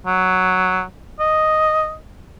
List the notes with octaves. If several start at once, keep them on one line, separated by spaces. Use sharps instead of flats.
F#3
D#5